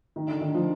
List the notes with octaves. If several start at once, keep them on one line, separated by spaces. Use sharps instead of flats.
D#3
D3
D#3
F3